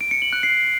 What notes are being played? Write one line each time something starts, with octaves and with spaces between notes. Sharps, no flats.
D7
C#7
F#7
F#6
C7